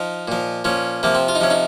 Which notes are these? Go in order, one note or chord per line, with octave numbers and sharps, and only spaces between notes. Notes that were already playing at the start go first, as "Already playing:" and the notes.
Already playing: F3 D#4
A#2 F3
A#2 F3 C#4
C3 F3 A#3
C4
F4
D#4
C3 F3 C#4
D#4